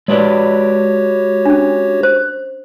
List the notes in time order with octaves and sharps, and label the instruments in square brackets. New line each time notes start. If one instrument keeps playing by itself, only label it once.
[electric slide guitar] G#3 B4 D5 [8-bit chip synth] F#4 G4 C#5
[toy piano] C#4 D4
C5